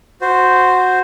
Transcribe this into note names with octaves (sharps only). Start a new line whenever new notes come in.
F#4 C5